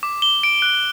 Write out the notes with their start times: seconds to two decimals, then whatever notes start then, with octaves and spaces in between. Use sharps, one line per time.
0.03 D6
0.22 G7
0.43 D7
0.62 F#6